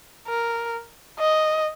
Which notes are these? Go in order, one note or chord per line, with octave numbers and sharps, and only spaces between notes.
A#4
D#5